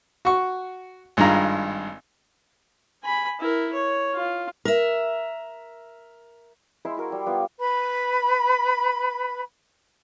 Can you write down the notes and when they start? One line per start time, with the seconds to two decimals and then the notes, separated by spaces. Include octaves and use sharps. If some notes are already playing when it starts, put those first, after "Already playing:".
0.25 F#4 C#6
1.17 G#1 G2 F4 A#5
3.03 G#5 B5
3.40 E4 A#4
3.73 C#5
4.14 F4
4.65 A#4 E5
6.85 G#3 E4 C5 B5
6.97 E4 F#4 A#4
7.10 G3 G5
7.26 G3 B3 F4 D5
7.61 B4 B5